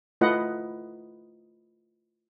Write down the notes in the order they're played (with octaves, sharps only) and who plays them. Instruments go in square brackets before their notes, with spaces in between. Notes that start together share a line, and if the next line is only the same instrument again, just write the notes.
[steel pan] A3 E4 F4 B4 D#5 F#5